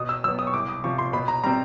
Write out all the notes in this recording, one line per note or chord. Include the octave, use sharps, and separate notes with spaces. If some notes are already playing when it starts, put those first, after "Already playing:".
Already playing: B2 D#6
E6
F#3 B3 E6
D#6
C#6
C2 D6
D#6
C3 F3 C#6
C6
B2 B5
A#5
G3 C4 A#5